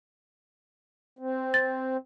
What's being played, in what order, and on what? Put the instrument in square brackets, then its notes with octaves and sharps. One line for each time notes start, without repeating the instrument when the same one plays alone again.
[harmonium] C4
[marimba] A6